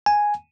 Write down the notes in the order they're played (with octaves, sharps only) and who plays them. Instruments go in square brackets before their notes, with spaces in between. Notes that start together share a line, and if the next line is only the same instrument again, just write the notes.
[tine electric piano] G#5